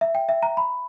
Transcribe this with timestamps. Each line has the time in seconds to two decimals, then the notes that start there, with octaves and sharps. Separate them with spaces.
0.01 E5
0.15 G5
0.29 E5
0.43 A#5
0.57 B5